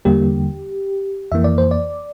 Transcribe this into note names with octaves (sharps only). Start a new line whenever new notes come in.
E2 D3 G3 A#3 G4
F2 E3 A#3 E5
D5
C5
D5